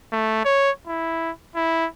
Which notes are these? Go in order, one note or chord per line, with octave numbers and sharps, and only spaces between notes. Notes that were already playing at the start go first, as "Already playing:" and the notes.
A3
C#5
E4
E4